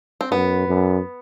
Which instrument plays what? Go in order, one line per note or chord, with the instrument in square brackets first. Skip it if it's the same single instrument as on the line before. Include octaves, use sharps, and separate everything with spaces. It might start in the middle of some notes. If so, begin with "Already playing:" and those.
[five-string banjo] C4
[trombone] F#2 [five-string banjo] B3
[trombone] F#2